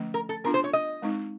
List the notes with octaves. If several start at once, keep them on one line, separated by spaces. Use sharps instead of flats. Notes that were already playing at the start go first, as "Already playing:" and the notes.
Already playing: D3 F3 A3 C#4
A#4
A4
B3 D4 F4 A#4
C5
C#5
D#5
G#3 C4 D#4